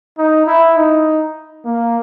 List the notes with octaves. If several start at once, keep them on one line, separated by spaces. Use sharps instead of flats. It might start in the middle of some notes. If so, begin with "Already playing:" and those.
D#4
E4
D#4
A#3